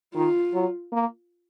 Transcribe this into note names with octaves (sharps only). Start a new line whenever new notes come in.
D#3 F4
F#3
A#3